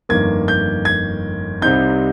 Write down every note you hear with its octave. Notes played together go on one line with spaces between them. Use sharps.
G1 F2 D#3 A#3 G#6
G6
G#6
C2 C3 G3 C4 D#4 G6